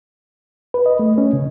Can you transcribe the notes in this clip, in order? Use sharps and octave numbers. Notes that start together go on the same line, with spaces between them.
B4
D#5
A3
C#4
C#3